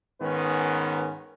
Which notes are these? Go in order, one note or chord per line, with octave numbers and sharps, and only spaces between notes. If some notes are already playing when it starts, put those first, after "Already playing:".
G#2 D#3 B3 C#4 A#4 B4